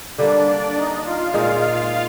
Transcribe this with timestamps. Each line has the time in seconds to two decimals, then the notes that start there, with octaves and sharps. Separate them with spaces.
0.18 D3 G3 A#3 D4 D5
0.76 D#4 D#5
1.05 F4 F5
1.34 A#2 G#3 D#4 G#4